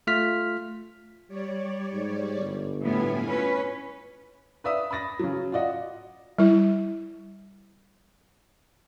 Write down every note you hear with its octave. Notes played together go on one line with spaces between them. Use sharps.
A3 F4 F6 B6
G3 C#5 D5
G#2
G1
A2 B3 E4 F4 G#5
C#4 B4
B4 D5 E5 D#6
B5 D#6 A6 A#6
C#3 F#3
F4 F#4 D5 D#5 F#5
G3 E4